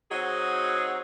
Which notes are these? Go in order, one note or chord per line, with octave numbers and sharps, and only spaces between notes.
F#3 C4 D#4 F#4 G#4